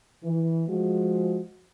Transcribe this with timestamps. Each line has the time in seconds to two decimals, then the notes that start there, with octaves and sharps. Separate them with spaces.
0.24 E3
0.69 F3 G#3 F#4